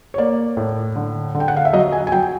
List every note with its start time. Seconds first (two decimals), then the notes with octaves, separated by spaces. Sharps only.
0.14 C#5
0.18 A#3 D5
0.57 A2
0.96 D3
1.35 D3
1.40 G5
1.48 F#5
1.57 F5
1.65 E5
1.73 F#3 D#5
1.92 G#5
2.07 G#5
2.12 F#3 G5